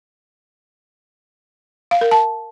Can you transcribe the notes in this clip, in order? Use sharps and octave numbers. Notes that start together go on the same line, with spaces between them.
F5
A#4
A5